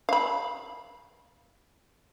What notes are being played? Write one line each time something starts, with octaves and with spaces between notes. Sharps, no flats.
F5 B5